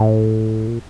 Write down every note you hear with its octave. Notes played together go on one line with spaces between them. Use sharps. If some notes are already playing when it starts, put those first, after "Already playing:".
Already playing: A2
A#2